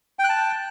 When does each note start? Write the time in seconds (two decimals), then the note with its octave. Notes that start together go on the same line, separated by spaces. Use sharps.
0.19 G5
0.24 F#6
0.29 A5